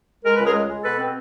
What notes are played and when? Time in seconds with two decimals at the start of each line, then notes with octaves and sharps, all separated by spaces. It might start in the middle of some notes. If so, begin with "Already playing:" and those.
0.24 G#3 A#4
0.35 C#2 B4
0.46 G#4 A#4
0.53 G#3
0.68 G#3
0.84 B2 A4 B4
0.99 C4